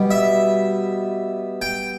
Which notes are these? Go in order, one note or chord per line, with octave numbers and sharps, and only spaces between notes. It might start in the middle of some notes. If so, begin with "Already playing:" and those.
Already playing: B2 G3
E5
G5